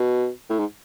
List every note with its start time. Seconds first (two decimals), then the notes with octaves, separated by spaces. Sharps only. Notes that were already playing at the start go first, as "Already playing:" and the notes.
Already playing: B2
0.50 A2
0.59 G#2